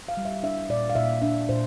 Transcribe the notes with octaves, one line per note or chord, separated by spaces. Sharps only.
F5
G3
E5
D4 E5
A#2 D5
F5
A#2 E5
D4 E5
A#2 C5